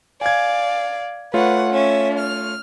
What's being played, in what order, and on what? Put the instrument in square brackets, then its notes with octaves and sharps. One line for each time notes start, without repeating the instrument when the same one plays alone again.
[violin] D5 F5 [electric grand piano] G#5 G#6
[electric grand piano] A3 F4 C#5 [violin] B4 F#5
[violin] C#4 E5
F6